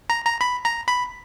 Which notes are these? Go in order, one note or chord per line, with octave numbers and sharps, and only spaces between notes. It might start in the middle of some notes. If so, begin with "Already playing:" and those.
A#5
A#5
B5
A#5
B5